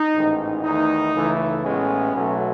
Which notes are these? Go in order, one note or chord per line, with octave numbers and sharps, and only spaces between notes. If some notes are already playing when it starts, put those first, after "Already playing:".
Already playing: D#4
A1 G#2 D#3
E2 D#3 A3 D#4
C#2 C#3 E3 A3
A1 A2 G#3 B3 C#4
B1 B2 F#3 A3